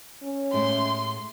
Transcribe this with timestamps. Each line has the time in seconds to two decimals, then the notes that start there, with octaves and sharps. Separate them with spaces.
0.23 C#4
0.53 A2 G#3 E4 C6